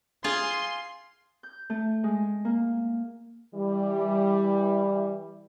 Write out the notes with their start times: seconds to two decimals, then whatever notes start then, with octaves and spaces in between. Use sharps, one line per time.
0.24 F4 G#4 C6
1.43 G6
1.70 A3
2.04 G#3
2.45 A#3
3.55 E3 G3